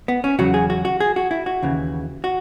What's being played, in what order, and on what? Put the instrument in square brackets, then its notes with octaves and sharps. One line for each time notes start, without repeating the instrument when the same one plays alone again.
[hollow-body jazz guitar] B3
C#4
E2 C#3 F#3 F#4
G#4
F#4
F#4
G#4
F#4
E4
F#4
D#2 C#3 E3
F#4